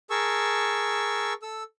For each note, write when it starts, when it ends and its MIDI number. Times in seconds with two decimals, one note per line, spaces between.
0.10 1.33 68
0.10 1.33 70
0.10 1.33 81
0.10 1.33 85
0.10 1.33 88
1.42 1.63 69
1.42 1.63 88